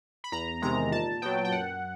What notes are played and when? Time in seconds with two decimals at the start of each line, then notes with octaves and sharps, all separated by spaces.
0.24 B5
0.32 E2 A#5
0.62 C3 D#3 G#3 A#5
0.92 A#2 A5
1.22 F#3 B3 G5
1.45 G5
1.51 F#2 F#5